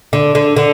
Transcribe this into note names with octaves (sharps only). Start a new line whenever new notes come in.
D3
D3
D3